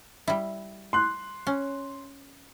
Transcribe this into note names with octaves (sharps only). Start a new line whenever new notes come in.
G3 E4
C6 F#6
C#4